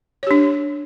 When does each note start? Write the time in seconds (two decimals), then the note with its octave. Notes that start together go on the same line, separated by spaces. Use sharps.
0.23 C#5
0.27 G4
0.31 D4